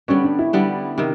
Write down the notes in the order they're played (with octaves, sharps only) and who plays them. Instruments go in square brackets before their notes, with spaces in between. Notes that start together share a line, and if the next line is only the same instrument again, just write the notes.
[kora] D3 G3 B3 [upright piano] C#4
[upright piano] D4
E4
[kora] D3 G3 B3
C3 D#3